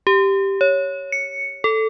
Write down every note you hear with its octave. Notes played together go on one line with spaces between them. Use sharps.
G4
C#5
C#7
A4